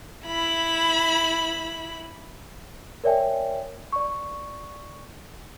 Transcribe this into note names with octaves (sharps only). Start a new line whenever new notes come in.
E4 B5
A#4 C#5 D5 E5 G5 G#5
D5 C#6